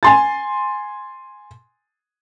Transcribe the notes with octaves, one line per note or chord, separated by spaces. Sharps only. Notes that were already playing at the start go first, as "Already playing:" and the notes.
G#5 C6 A6